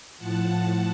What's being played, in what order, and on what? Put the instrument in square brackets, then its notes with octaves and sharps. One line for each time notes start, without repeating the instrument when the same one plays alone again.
[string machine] A2 F3 F#5 A5